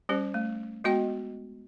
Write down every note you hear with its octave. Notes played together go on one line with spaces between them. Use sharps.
G3 C#4 G4 C5
A3
G#3 B3 F#4 D#5 G5